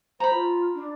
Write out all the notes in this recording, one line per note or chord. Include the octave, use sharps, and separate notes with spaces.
C5 A#5 B5
F4
D4